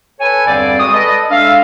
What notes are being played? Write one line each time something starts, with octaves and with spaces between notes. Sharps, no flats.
A4 B4 C#5 G#5
E2 G2 D3 G3 C4 D5
G#3 F#4 G#4 D#6
A4 B4 D5 D#5
G#3 D4 A4 E5 F5